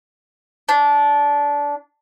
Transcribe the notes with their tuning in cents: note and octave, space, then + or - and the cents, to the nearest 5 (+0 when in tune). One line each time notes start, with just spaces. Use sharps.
D4 -20